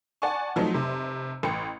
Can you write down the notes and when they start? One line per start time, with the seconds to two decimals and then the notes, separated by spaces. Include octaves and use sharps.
0.22 D5 F#5 G#5 A5 C#6
0.56 F3 F#3 A3 C4 D#4
0.74 F1 C3
1.43 A1 G5 C#7